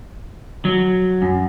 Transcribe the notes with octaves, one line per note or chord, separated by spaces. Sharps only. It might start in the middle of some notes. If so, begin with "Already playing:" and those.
F#3
F#2